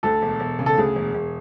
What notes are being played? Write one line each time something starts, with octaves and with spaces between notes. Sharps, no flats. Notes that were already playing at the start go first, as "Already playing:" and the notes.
D2 A4
E1
E1
C#3
A4
D2 G#4
E1
E1